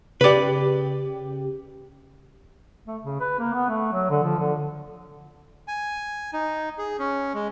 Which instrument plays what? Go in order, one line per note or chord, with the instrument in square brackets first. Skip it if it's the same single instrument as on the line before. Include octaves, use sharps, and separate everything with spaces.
[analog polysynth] C#3 G4 [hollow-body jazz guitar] B4 D5
[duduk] A3
C#3
B4
A#3
B3
A3
F#3
D3
F3
D3
[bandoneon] G#5
D#4
G#4
C#4
G#3